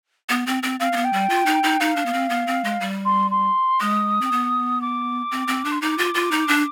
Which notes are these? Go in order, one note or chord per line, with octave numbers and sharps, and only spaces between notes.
B3
C4
C4
C4 F5
C4
B3
G5
G3
F4
D#4
D#4
D#4 F5
D4
B3
C4
B3
C4
G#3
G3
C6
C6
G#3 D#6
C4
B3
D6
C4
C4
D4
C6
D#4 D6
F4
F4
D#4
D4